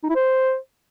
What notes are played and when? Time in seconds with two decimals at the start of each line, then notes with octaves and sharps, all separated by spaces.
0.04 D#4
0.10 E4
0.16 C5